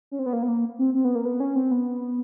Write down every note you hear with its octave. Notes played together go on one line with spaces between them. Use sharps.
C#4
C4
B3
A#3
B3
A#3
C4
C4
B3
A#3
B3
C#4
C4
B3